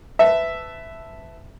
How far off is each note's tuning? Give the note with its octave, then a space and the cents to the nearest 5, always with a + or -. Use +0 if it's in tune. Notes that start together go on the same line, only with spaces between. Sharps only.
B4 +25 E5 +0 A5 +0